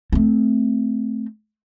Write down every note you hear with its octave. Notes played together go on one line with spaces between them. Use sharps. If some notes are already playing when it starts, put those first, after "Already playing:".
A3 C4